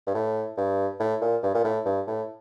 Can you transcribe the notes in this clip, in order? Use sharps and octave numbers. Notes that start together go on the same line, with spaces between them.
G2
A2
G2
A2
A#2
G2
A#2
A2
G2
A2